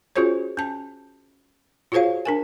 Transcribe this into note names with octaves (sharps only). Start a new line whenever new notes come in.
C#4 F4 F#4 G#4 C5 C#5
C#4 A5
F4 F#4 G#4 C5 C#5 F5
D4 A#4 G#5